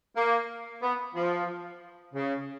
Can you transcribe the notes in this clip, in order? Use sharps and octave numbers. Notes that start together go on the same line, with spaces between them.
A#3
B3
F3
C#3